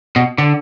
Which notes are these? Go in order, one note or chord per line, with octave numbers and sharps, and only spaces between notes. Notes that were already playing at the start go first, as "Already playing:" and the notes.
B2
D3